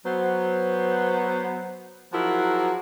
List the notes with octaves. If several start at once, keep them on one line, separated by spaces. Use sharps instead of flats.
F#3 B3 C5
F3 F#3 E4 F#4 G#4 A#4